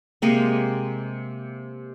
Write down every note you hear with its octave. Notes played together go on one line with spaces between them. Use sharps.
C3 G#3 A#3 C4